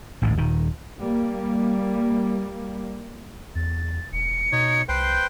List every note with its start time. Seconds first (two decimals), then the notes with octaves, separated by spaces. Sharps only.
0.22 A1 D2 G#2 D3
0.37 D#1 D#3
1.00 G3 A#3
3.55 E2 A6
4.12 E1 C#7
4.52 B2 D#4 C#5
4.89 C2 B4 C5 G5 C7